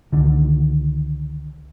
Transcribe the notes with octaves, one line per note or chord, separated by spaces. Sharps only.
C#2 D3 D#3